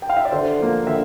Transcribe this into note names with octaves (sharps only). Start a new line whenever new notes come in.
G5
F5
E5
D5
D3 C5
F3 A#3
D3 E5